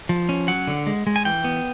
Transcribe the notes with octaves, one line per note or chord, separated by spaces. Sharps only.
F3
C#4
F#3 F#5
D3
G#3
G#3
G#5
E3 G5
B3